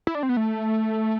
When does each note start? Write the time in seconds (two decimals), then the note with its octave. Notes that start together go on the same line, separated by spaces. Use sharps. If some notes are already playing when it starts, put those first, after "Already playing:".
0.07 E4
0.15 D4
0.23 C4
0.29 B3
0.37 A3